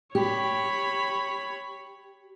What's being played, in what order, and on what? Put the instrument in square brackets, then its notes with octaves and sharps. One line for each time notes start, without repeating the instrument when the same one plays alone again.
[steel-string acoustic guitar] G4 [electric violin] C#5 B5